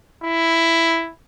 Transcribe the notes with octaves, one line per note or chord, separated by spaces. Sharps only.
E4